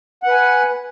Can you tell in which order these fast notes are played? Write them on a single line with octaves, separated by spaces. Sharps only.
F#5 B4 G#5